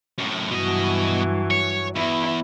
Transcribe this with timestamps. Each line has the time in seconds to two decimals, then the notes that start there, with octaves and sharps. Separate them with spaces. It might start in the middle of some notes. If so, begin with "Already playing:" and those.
0.18 F#2 A2
0.50 G2 B2 E3 F#3 D#5
1.51 C#5
1.95 E2 E4